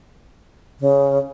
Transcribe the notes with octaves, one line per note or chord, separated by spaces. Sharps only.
C#3